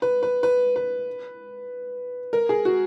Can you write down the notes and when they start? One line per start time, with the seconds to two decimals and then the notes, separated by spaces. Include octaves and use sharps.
0.02 B4
0.23 B4
0.43 B4
0.76 B4
2.33 A#4
2.49 G#4
2.65 F#4